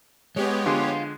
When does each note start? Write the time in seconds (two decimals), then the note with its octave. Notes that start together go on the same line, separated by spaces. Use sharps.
0.36 G#3 B3 G4 C#5
0.66 D3 F3 G#3 F4